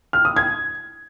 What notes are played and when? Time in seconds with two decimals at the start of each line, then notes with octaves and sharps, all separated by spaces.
0.13 F6
0.25 D#6
0.36 G#6